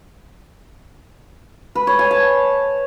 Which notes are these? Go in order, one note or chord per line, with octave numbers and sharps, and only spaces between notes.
B4
C#5
G#5
A5